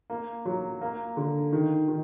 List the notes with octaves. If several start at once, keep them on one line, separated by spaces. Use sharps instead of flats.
A#3
F#3
A#3
D3
D#3
D#3